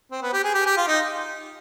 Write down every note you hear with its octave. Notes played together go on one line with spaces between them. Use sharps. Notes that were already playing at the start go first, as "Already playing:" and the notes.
C4
B3
G4
G#4
G4
G4
F4
D#4